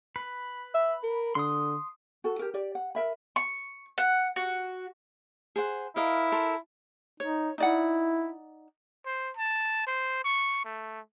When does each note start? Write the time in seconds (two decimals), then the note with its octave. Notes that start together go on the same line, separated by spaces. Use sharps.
0.16 B4
0.75 E5
1.03 A#4
1.35 D3 C6 D#6
2.24 F#4 A4
2.39 G4 A#4
2.54 G4 D5
2.75 F#5
2.95 A#4 E5 B5
3.36 C#6
3.98 F#5
4.36 F#4
5.56 G#4 C5 F#5
5.96 E4 A#4 D#5 F5
6.32 A4 A#4 C6
7.20 D#4 C#5
7.58 D#4 E4 D5 F#5
9.06 C5
9.37 A5
9.87 C5
10.24 C#6
10.65 A3